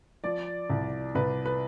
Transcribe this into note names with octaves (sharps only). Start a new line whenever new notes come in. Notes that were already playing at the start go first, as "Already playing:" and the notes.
F3 D5
C2
C2 B4
B4